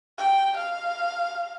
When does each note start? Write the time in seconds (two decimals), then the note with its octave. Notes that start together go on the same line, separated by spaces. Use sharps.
0.18 G5
0.57 F5